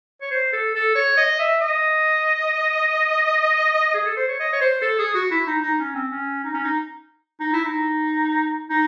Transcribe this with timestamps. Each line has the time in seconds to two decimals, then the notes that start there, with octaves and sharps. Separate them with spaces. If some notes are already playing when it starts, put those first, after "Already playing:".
0.21 C#5
0.31 C5
0.53 A4
0.75 A4
0.95 C#5
1.17 D#5
1.39 E5
1.61 D#5
3.94 G#4
4.06 A4
4.17 C5
4.28 C#5
4.39 D#5
4.53 C#5
4.61 C5
4.82 A4
4.99 G#4
5.14 F#4
5.31 E4
5.47 D#4
5.62 D#4
5.79 C#4
5.95 C4
6.11 C#4
6.44 D#4
6.54 C#4
6.64 D#4
7.40 D#4
7.53 E4
7.64 D#4
8.69 D#4